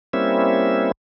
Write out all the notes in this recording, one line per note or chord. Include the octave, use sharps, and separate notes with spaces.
G3 A#3 C4 C#4 E4 E5